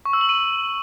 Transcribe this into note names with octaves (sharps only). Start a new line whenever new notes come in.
C#6
E6
F#7
D#7